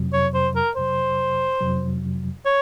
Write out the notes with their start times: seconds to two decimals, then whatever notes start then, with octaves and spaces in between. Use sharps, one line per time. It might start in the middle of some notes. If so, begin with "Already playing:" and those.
Already playing: F2 C3 F#3
0.13 C#5
0.34 C5
0.56 A#4
0.76 F2 C3 F#3 C5
1.61 F2 C3 F#3
2.45 C#5